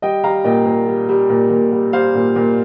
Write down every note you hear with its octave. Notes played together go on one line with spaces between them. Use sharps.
G3 D#5 G5
G3 F5 A#5
A#2 D#5 G5
A#2
G3
G3
A#2
A#2
G3
G3 C5 F5
A#2
A#2